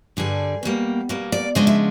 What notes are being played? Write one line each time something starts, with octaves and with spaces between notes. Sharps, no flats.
G2 D3 G3 G#4
B2 G3 A#3
B2 G3 A#3
D5
C#3 F3 G#3 B3 D4 D#5
E5